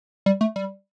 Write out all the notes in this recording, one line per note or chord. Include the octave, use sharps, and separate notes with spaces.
G3
A3
G3